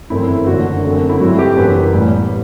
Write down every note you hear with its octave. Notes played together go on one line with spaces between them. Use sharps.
G1 F#2 E3 A3 C4 E4
F#1 F#2 D3 A3 F#4
F#1 F#2 D3 A3 C4
E4
G2 F#3 A3 C4 F#4
G4
F#1 F#2 E3 B4
A1 A2 G3 B3